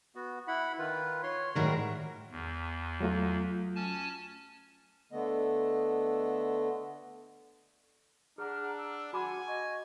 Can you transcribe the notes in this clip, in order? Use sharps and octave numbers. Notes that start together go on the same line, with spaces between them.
B3 F#4
E4 F#5 B5
D#3 F4 B4
C#5 C6
A2 D#3 G3 G#3 F#4 A#4
E2
F#3 A3 F4
C#4 G#5 A5
D3 A3 B3 D#5
D4 G#4 F#5 A#5 F6
E6
F#4 F#5 G#5 B5 D6
D#5 C#6 G#6